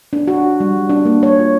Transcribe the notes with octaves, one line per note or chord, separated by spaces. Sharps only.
D4
F#4
G3
D4
A#3
C#5
F4